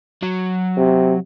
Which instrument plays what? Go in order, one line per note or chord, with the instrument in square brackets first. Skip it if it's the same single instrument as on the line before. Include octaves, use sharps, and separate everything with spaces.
[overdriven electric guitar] F#3
[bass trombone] C3